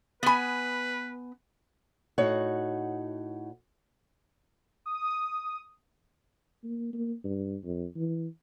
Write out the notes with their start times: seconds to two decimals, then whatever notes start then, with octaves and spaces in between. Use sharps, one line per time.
0.23 B3 B4 G#5 B5 A6
2.18 A2 D#4 F#4 C#5 F#5
4.86 D#6
6.64 A#3
6.93 A#3
7.25 G2
7.64 F2
7.96 E3